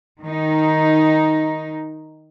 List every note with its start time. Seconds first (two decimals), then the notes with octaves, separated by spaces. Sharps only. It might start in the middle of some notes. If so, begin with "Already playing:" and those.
0.22 D#3 D#4